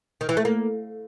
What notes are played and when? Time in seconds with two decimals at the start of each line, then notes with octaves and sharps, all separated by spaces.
0.21 D#3
0.29 E3
0.37 A3
0.45 A#3